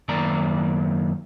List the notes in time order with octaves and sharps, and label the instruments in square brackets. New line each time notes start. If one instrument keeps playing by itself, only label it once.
[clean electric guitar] F#2 D#3 A#3 D5 A#5